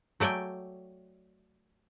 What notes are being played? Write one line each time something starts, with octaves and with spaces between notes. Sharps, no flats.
F#3 A3 D5 G5 G#5